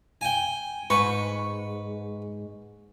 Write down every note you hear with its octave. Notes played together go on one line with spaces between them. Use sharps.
G5 G#5
G#2 B4 C#6